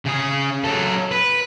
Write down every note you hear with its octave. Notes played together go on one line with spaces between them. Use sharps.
C#3 G#4
F#3 A4
B4